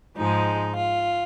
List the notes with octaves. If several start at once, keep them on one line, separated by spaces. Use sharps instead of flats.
G#2 F3 G#3 D#4
F4